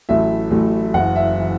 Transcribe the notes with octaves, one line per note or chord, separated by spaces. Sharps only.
A1 A2 F#3 A3 E5
A1 A2 F#3 A3
F#1 F#2 E3 F#5
E5
E3